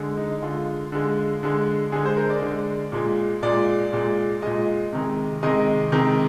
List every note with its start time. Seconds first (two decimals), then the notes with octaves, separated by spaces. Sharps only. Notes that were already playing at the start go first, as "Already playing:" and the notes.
Already playing: D3 G#3
0.17 D#4
0.42 D3 G#3 F4
0.92 D3 G#3
1.43 D3 G#3
1.92 D3 G#3 G#4
2.05 C5
2.17 A#4
2.30 D5
2.42 D3 G#3
2.92 A#2 G#3
3.42 A#2 G#3 D5
3.93 A#2 G#3
4.42 A#2 G#3 D#5
4.92 C3 D#3 G#3
5.43 C3 D#3 G#3 D#5
5.92 C3 D#3 G#3